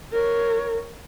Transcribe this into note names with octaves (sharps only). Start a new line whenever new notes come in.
A#4 C#5